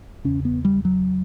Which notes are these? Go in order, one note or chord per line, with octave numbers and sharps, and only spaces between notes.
E2 C#3 C#4
B3
G3
F#3